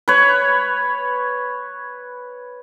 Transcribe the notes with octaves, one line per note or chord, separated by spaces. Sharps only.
B4 C#5